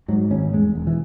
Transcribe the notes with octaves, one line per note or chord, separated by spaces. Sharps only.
G#2 F#3
G#1 C#4
E2 G#3
E1
E3